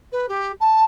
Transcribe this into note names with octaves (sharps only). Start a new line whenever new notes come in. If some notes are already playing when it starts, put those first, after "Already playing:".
B4
G4
A5